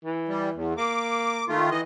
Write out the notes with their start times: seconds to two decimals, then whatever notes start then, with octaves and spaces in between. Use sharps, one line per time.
0.05 E3
0.29 G3
0.54 E2
0.78 A#3 D6
1.48 D#3 A3 F4
1.71 E3 D#5